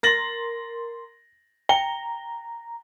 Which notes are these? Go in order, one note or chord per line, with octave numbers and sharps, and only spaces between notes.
A#4 C6 A6 A#6 F#7
G5 A#5 G7